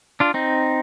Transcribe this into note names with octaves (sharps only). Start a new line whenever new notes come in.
D4 F4
C4 D#4